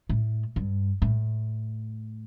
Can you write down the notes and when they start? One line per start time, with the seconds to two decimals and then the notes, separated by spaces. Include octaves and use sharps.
0.09 A2
0.56 G2
1.02 A2